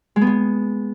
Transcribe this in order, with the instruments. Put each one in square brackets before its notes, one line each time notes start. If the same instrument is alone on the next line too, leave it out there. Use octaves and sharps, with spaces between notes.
[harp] G#3
B3
G#3